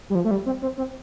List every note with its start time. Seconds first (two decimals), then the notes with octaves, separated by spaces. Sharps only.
0.10 G3
0.15 F3
0.25 A3
0.31 G3
0.46 C4
0.62 C4
0.78 C4